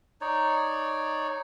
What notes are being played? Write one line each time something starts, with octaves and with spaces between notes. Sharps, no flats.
D#4 C#5 D5